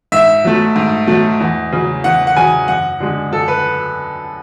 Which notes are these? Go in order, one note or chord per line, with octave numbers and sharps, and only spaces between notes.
G#2 E5
F#3 A3
G#2
F#3 A3
E2
C#3 F#3
E2 F#5
F#5
C#3 F#3 G#5
F#2 F#5
D3 G#3
F#2 A4
B4